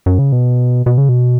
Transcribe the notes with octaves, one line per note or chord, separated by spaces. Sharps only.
F#2
C#3
B2
B2
C#3
B2